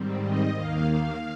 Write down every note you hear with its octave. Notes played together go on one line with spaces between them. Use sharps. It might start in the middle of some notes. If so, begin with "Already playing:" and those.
Already playing: G#2 D#3 G3 C4
D#5
D#2 D#3 A#3 F5
F5